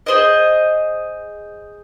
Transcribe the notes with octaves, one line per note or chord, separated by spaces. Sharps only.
G#4 C5 D#5